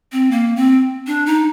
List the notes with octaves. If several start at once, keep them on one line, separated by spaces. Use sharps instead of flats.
C4
A#3
C4
D4
D#4